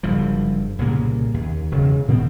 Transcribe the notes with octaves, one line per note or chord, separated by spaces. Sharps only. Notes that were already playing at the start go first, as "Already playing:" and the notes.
F#1 G2 F3
C2 A#2 C#3 A#3
D#2
E1 C#3
A#2 D#3 B3 C4